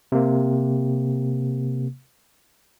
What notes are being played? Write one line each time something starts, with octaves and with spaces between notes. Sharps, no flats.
C3 A#3